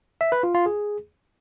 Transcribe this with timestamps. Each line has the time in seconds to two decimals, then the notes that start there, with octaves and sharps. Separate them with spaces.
0.21 E5
0.32 B4
0.43 F4
0.55 F4
0.66 G#4